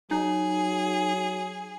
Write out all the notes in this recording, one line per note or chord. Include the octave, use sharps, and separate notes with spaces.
F#3 D#4 G#4